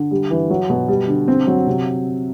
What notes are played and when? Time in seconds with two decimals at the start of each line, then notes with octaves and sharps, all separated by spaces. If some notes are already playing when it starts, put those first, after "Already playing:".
Already playing: D3
0.11 G3
0.31 E3
0.50 F#3
0.70 B2
0.88 G3
1.08 D3
1.28 C4
1.47 F#3
1.67 C3